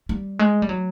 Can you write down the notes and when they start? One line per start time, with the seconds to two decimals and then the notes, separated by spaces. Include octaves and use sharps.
0.09 G3
0.39 G#3
0.62 G3
0.69 F#3